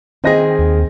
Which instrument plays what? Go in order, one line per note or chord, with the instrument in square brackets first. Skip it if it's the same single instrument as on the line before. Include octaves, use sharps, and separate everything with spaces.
[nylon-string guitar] D#3 G#4 [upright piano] C4 D#5 A#6
[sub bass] D#2